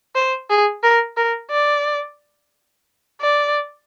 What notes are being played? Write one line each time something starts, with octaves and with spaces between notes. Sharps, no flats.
C5
G#4
A#4
A#4
D5
D5